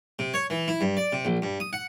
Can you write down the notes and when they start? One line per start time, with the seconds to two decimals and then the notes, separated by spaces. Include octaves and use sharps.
0.19 C3
0.34 C#5
0.50 E3
0.68 E4
0.81 G2
0.97 D5
1.13 C3
1.25 A#1
1.42 G2
1.60 D#6
1.73 F#5